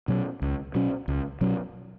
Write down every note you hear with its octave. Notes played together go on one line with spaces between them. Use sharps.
B2 F#3 C#4
C#2
B2 F#3 C#4
C#2
B2 F#3 C#4